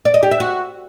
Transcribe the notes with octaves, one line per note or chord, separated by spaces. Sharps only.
D5
D#5
G4
E5
F#4